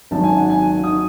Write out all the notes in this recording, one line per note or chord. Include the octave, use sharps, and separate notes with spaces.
G#1 F#2 D#3 A5
G#5
F#5
G#5
D#3 D#6